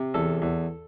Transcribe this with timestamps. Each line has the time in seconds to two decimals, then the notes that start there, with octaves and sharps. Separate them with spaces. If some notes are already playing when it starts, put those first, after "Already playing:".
Already playing: C3
0.14 E2 A4
0.42 E2